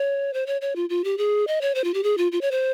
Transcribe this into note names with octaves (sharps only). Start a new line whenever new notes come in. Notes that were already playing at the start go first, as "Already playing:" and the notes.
Already playing: C#5
C5
C#5
C#5
F4
F4
G4
G#4
D#5
C#5
C5
F4
G4
G#4
F4
F4
C#5
C5